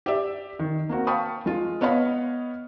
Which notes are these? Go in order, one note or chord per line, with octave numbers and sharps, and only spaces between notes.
G4 D5 E5
D#3
A#3 C4 F#4
F5 G5 A5 B5 C#6 D#6
G#3 F4
B3 C#5 D#5 F5 B5